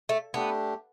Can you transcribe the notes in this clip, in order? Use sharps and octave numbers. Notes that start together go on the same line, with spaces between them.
A3
A3 B3 D4 G4